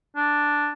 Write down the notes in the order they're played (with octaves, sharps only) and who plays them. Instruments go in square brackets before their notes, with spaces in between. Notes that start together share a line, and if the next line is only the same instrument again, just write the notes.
[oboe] D4